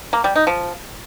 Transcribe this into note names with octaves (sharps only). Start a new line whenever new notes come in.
A#3
G3
D#4
F3